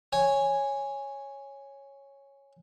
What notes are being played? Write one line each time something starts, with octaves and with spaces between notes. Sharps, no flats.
C#5 G#5